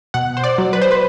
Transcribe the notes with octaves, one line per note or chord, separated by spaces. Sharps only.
B2 F#5
C5
D5
F#3
B4
C5
B4